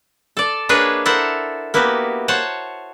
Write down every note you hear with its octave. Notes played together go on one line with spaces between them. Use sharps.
A4 D5
A#3 D4 G#4 B4 C#5 D#5
E4 A4 A#4 C5 F#5
A#3 B3 E4 F#4 G4
C5 C#5 F#5 A5